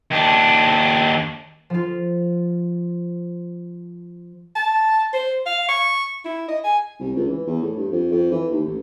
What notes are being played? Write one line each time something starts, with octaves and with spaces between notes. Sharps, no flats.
D#2 D4
F3 F4
A5
C5
F5
C#6
E4
D#5
G#5
C2
C#2
E3
E2
A2
G2
F2
F2
E3
D#2
A1